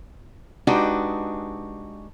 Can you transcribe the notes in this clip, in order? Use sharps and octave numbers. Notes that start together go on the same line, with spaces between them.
G#3 D4 D#4 F#4 G4 B4